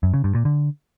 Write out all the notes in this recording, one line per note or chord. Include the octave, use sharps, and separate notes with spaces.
F#2
C#3
G2
A#2
D3